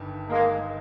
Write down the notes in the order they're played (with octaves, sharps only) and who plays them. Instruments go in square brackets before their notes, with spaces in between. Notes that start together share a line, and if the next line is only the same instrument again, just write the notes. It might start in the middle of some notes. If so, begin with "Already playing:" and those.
Already playing: [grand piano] G1 G2 D#3
[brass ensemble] G#3 A#3